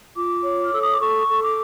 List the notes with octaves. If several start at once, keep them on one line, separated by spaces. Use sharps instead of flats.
F4 D6
C#5
F6
A4 E6
D#6
D6
A4 C#6
A4
D6